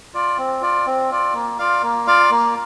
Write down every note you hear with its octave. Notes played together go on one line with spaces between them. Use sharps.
F4 D5
C4
F4 D5
C4
F4 D5
A#3
F4 D5 F5
A#3
F4 D5 F5
A#3